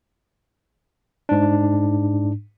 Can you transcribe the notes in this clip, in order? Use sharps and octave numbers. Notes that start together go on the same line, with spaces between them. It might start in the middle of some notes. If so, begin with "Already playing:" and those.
G#2 D4